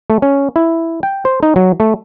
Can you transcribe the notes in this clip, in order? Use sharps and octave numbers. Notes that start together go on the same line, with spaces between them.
A3
C#4
E4
G5
C5
D#4
F#3
A3